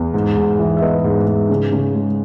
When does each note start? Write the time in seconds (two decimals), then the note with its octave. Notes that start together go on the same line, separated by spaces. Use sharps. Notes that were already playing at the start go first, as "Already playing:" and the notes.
Already playing: E2
0.14 G#2
0.37 G#2
0.59 E3
0.77 E5
0.82 B3 B4 D#5
1.04 G#2
1.27 G#2
1.50 C#3
1.72 C#3
1.95 G#3